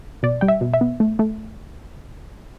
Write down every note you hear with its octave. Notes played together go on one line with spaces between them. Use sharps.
B2 D5
G3 G5
E5
B2
E5
B3
A3
A3